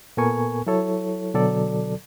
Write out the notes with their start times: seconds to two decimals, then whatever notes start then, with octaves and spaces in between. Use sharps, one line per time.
0.17 A#2 B3 A4 A#4 G#5 C#6
0.67 F#3 E4 A4 C#5
1.34 B2 D3 F#3 A4 D5